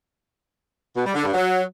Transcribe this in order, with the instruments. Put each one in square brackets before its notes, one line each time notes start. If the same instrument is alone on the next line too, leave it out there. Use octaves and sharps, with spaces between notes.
[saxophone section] B2
G3
D3
G2
F#3